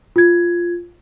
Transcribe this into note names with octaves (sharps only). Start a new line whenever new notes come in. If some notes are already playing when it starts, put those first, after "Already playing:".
F4 G#6